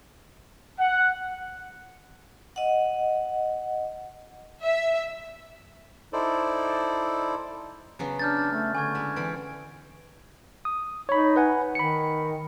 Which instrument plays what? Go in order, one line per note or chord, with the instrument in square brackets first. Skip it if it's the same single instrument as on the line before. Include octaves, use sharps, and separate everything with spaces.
[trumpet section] F#5
[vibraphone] D#5 F#5
[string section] E5
[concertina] D#4 E4 A4 C5 D5
[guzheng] C#3 F#3 B3
[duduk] D4 [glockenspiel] F6 G6 A6
[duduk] A3
[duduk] D3 [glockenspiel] G#5 C#6 G#6
[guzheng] G#3 E4
[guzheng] E3 C4 B5 [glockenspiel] D7
[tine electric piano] D#6
[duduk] D#4 [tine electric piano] C#5 B5
[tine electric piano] B4 F#5 G#5
[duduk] D#3 [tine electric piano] B5 C#7